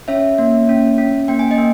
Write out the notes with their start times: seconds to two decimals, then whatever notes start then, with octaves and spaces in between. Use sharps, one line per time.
0.08 C#4 C#5 E5
0.38 A#3
0.69 C#4
0.98 C#4
1.28 A#3 G5
1.39 G#5
1.51 D#5 G5
1.58 A#3